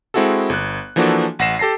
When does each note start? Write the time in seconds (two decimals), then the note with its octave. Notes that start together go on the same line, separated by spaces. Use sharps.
0.14 G#3 C4 E4 F#4 G#4 A4
0.50 G1 F#6
0.96 E3 F3 A#3 D4 F#4 A4
1.39 A1 F#5 A#6 C7 E7
1.59 G4 A4 A5 A#6 C7